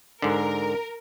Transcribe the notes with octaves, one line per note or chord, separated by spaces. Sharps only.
G#2 D3 A#4